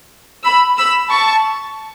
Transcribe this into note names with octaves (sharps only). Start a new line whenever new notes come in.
B5 E6
B5 E6
A5 C#6